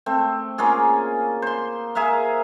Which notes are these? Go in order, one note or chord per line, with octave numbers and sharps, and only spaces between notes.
A3 C4
A#3 C#4 F4 G#4
C5 C6
G#4 A#4 E5 F5